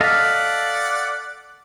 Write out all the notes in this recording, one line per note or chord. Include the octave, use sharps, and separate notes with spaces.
A4 D5 D#5 F5 F#5 F6 B6